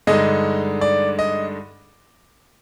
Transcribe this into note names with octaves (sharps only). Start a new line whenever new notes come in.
G2 D3 G#3 D#4 D#5
D5
D#5